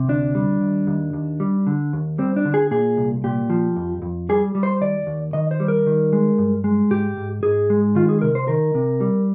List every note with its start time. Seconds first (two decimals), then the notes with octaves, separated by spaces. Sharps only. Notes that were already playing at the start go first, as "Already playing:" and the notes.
Already playing: C3
0.09 D2 D4
0.35 G3
0.61 D#2
0.87 D#2
1.13 D#2
1.40 G3
1.67 D3
1.93 D#2
2.18 G3 C4
2.36 D4
2.45 D3
2.54 G#4
2.71 A#2 G#4
2.97 C2
3.24 A#2 G4
3.50 F3
3.76 F2
4.02 F2
4.29 G3 G#4
4.55 G3
4.63 C5
4.81 D#2 D5
5.07 D#2
5.33 D#3 D#5
5.51 C5
5.60 G3
5.68 A#4
5.87 D#3
6.13 G#3
6.39 G2
6.64 G#3
6.91 G#2 G4
7.17 G#2
7.43 G#2 G#4
7.70 G#3
7.95 D#3 F4
8.09 G#4
8.21 C3 A#4
8.35 C5
8.48 D#3 A#4
8.75 C3
9.01 G3